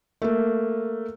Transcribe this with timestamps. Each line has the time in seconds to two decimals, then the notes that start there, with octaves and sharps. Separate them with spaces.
0.22 A3 A#3